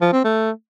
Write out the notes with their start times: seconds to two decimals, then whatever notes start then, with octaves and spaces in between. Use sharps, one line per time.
0.01 F3
0.13 C4
0.24 A3